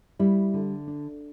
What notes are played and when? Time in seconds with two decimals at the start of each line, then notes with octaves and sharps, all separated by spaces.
0.19 G3 E4
0.54 D3
0.87 D4